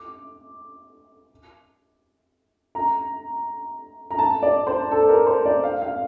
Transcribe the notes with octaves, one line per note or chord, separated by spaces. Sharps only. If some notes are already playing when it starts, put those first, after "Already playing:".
Already playing: D6
A#5
A#5
A5
D5
C5
A4
A#4
C5
D5
F5
F5